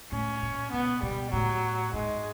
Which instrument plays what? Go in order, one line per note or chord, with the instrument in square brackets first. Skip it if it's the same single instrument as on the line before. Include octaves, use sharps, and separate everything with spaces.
[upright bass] A2 [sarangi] C#4
[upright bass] A#2
[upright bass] B2 [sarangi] B3
[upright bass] B2 [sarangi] G3
[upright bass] A2 [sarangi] F#3
[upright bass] G#2 [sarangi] G#3